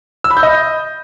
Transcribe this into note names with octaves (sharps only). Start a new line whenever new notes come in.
E6
B5
G6
D#5